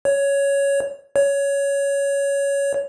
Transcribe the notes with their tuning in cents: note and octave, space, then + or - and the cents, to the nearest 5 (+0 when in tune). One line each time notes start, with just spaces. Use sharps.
C#5 +10
C#5 +15